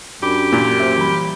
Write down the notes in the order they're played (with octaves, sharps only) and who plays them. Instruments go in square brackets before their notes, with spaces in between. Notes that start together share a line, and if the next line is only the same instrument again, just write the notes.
[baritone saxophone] F#2 [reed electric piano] D4 B5 D6 [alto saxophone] G4
[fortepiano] A#2
[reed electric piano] C5 E5
E3 G3 B5